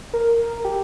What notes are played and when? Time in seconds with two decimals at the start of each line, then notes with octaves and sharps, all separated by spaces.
0.13 A#4
0.65 G4